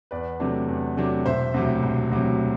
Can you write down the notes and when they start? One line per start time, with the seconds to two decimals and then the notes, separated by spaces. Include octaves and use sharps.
0.11 E2 B4 D5
0.40 C3 F#3 A3 D4
0.69 E2
0.97 C3 F#3 A3 D4
1.26 E1 C5 E5
1.54 D2 C3 F#3
1.83 E1
2.11 D2 C3 F#3